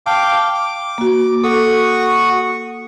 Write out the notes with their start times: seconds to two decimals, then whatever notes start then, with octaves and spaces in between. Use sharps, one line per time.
0.06 F5 G5 A5 D6
0.55 D6
0.98 A#3 F#4
1.44 F#4 A4 C#6 D#6